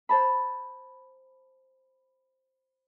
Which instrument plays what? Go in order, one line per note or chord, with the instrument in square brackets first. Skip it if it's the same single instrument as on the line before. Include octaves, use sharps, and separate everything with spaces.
[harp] C5 A5 B5